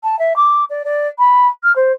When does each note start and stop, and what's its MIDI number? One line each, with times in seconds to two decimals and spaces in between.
0.03 0.18 81
0.19 0.36 76
0.36 0.64 86
0.70 0.82 74
0.85 1.08 74
1.18 1.48 83
1.63 1.74 89
1.75 1.92 72